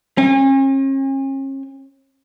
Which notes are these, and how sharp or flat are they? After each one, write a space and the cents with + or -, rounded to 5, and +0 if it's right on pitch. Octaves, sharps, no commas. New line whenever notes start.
C#4 -40